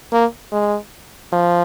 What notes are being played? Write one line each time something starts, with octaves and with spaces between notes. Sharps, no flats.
A#3
G#3
F3